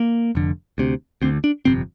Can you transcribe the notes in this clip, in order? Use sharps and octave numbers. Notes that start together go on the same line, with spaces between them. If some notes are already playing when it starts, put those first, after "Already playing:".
Already playing: A#3
F1 F2 D3
D2 C3
D2 D3 C4
D4
G1 F2 C3 C4